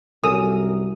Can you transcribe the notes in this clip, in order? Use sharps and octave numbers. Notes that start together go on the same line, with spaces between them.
C2 F#2 A4 A#4 G#5 D#6